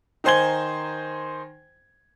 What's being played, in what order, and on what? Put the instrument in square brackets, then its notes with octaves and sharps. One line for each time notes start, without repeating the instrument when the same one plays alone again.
[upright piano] D#3 D#4 C5 G#5 G#6 G7